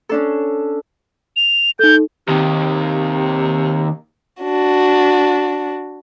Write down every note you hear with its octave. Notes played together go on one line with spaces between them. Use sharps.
C#4 D4 A4
F7
D#4 A4 G6
D#2 C3 D#3
D4 F#4